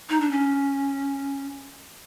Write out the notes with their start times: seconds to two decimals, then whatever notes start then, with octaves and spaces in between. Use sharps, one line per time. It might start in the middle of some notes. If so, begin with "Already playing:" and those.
0.09 D#4
0.20 D4
0.31 C#4